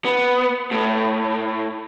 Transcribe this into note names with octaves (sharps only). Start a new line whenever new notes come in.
B3
A2